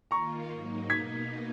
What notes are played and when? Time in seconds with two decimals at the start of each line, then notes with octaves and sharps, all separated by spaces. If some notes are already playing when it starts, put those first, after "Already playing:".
0.11 D#3 A#3 F4 A#5 C#6
0.50 G#2 F#3 A#3 D#4
0.90 B2 A#3 D#4 G#6 B6